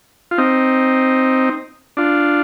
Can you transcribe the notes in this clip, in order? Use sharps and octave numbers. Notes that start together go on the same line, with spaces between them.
F4
C4 D#4
D4 F4